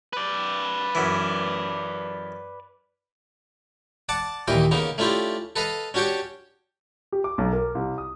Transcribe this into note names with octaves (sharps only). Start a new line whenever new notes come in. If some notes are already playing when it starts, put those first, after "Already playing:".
B4 D5
F#2 E3
D5 F#5 A5 D6
D#2 A#2 E3 D#5 G5
C#3 A#3 B3 D#4
A3 C#4 D4 E4 F4 G4
A4 B4 D#5 F5
C#4 D4 F#4 G4 C#5 G5
G4
D6
B1
A#4
C2
D#6